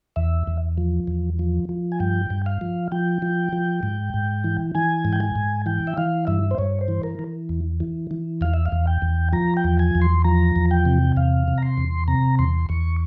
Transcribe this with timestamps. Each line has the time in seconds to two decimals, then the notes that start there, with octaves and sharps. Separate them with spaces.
0.16 E2 E5
0.47 E2
0.78 F3
1.07 E2
1.39 F3
1.69 F3
1.92 G#5
2.00 G2 G5
2.30 G2
2.46 F5
2.61 F3
2.92 F3 G5
3.22 F3
3.53 F3
3.83 G#2
4.14 G#2
4.44 E3
4.75 E3 G#5
5.05 G#2
5.13 G5
5.20 G#5
5.35 G#2
5.66 E3 G5
5.87 E5
5.98 E3 F5
6.27 G2 E5
6.51 C5
6.58 G2 C#5
6.81 C5
6.88 E3
7.03 A#4
7.19 E3
7.49 E2
7.80 E3
8.11 E3
8.41 E2 F5
8.54 E5
8.66 F5
8.72 E2
8.87 G5
9.02 E2
9.33 F3 A#5
9.57 G5
9.64 E2
9.79 G#5
9.95 E2
10.02 C6
10.24 F3 A#5
10.56 E2
10.71 G5
10.85 C3
11.17 E2 F5
11.48 C3
11.58 A#5
11.63 C6
11.78 E2
12.08 C3 A#5
12.39 E2 C6
12.69 E2 C#6